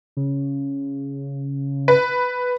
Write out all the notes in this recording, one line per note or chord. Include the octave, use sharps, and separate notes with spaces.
C#3
B4